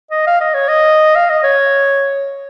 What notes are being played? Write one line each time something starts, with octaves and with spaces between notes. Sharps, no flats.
D#5
F5
D#5
C#5
D#5
F5
D#5
C#5